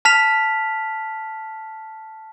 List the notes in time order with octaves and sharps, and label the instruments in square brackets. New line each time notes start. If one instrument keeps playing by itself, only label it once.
[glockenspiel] A5 F6 B6 F7